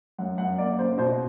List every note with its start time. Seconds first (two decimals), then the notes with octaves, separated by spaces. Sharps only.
0.18 F#2 F#5
0.38 F#2 F#5
0.58 A#3 D5
0.79 C#3 C5
0.98 B2 C5